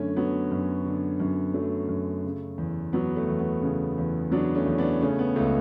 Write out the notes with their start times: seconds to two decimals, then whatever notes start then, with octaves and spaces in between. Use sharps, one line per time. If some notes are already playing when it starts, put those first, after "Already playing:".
Already playing: F#2 D3 A3 C#4
0.17 F#3 B3
0.51 F#2
0.86 D3
1.20 F#2
1.54 F#3 A3
1.89 F#2
2.24 C#3
2.58 E2
2.93 F#3 B3
3.16 A3
3.29 E2
3.39 B3
3.62 C#3
3.98 E2
4.32 F#3 B3 D4
4.55 A3 C#4
4.66 E2
4.78 B3 D4
5.01 C#3 A3 C#4
5.19 B3
5.36 C#2 A3